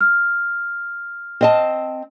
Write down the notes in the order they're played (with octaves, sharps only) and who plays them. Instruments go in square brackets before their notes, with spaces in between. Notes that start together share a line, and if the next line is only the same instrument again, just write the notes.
[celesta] F6
[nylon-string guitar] C4 D#5 A5